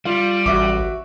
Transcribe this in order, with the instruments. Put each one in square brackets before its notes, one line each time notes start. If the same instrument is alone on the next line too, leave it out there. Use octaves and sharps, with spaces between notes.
[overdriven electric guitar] G3 [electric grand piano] F4 F5
[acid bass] A1 [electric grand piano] F#4 E5 D6